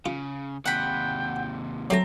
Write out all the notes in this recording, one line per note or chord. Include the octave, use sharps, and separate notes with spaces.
C#3 F4
D#2 C3 F#5 G5 B5
F#3 A3 C4 A#5